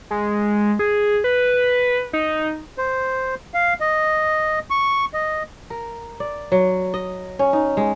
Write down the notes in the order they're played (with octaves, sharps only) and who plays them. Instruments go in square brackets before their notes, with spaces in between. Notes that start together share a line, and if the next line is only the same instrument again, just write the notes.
[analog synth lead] G#3
G#4
B4
D#4
[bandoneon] C5
F5
D#5
C#6
D#5
[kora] A#4
D5
F#3
D#5
C#4
D#4
G#3